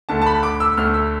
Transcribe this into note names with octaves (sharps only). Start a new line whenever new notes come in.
D2 D3 A3 A5
A5
B5
D6
E6
D2 D3 A3 F6
E6